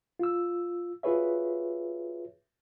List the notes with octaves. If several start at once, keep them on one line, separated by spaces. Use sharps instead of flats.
F4 E6
F4 F#4 G#4 B4 C#5 E5